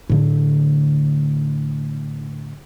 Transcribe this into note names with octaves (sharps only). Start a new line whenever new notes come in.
A2 D3